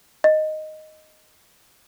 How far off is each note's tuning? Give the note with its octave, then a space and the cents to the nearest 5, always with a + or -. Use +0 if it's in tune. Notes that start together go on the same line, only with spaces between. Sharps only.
D#5 -5